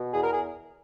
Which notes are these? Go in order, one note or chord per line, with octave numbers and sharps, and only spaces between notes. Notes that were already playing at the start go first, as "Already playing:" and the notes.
Already playing: B2
E2 G#4
A#4
G#4